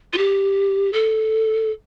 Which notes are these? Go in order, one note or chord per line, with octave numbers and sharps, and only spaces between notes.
F4
G4
A4